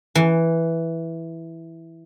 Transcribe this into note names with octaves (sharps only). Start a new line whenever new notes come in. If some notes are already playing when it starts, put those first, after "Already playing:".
E3